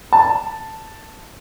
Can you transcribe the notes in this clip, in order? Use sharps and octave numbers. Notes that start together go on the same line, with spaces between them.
A5